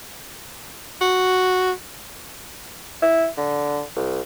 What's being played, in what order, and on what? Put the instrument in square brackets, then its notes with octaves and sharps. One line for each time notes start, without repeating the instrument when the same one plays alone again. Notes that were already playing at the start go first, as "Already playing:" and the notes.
[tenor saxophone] F#4
[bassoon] E4
D3
C2